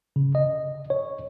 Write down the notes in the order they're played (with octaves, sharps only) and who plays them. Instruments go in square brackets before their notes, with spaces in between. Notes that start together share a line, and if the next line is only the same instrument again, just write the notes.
[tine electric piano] C#3
D#5
C#5